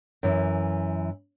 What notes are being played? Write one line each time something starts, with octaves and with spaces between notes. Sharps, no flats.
F#2 E3